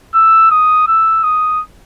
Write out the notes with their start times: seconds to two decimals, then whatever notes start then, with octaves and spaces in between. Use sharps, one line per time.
0.14 E6
0.51 D#6
0.88 E6
1.23 D#6